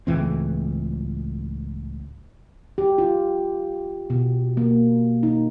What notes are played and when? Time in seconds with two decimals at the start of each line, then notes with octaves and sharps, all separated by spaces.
0.07 C#2 A2 E3 C4
2.78 G4
2.98 F4
4.10 B2
4.57 A#3
5.23 D#4